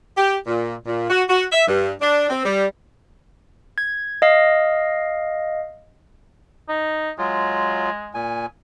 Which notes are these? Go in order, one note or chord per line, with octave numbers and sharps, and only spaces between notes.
G4
A#2
A#2
F#4
F#4
E5
G2
D4
C4
G3
G#6
D#5 F5
D#4
F#3 G#3 F4
A#2 G#5